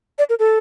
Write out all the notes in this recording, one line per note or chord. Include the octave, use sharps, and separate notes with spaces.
D5
A#4
A4